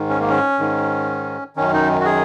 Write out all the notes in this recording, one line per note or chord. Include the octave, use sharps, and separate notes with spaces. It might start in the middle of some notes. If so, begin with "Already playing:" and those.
Already playing: G#2 D#3
C#4
A#3
C#4
G#2 D#3
F#2 D#3 C#4
D#4
F#4
G#4